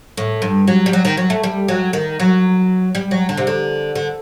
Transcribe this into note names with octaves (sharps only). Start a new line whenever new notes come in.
A2
G2
F#3
G3
F#3
D#3
F#3
A3
G3
F#3
D#3
F#3
G3
F#3
D3
C3
D3
D3